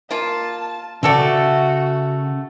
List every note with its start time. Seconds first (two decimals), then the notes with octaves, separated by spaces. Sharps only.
0.11 A#3 F4 A5
1.03 C#3 A3 F#4 A4 D5 E5 G5